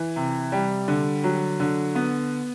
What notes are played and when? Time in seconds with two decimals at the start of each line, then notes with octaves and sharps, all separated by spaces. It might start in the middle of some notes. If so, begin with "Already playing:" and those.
Already playing: E3
0.16 C3
0.52 G3
0.88 D3
1.24 F#3
1.60 D3
1.95 B3